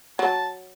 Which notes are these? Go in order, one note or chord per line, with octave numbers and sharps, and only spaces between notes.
F#3 A5